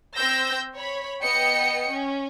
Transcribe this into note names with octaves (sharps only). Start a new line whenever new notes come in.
C4 E6 G6 A#6
C#5 B5
B3 D#5 G5 C#7
C#4